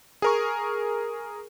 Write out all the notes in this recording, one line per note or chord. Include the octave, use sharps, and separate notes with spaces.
G#4 A#4 C#6